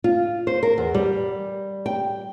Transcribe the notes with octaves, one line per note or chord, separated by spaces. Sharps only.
F4
C5
A#4
E2
G3
G5